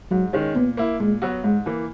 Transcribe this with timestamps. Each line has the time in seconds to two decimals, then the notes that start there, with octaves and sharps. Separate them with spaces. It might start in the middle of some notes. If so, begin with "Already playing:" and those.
0.11 G#2 F#3
0.33 D#3 G#3 C#4
0.55 A#2 B3
0.77 A#3 E4
1.00 A#2 G#3
1.22 F#3 B3 F#4
1.44 G#2 G#3
1.66 E3 A#3